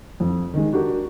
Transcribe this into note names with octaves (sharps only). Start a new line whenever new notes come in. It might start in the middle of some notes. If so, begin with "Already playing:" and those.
F2
D#3 G#3
D4 F#4 G4 A#4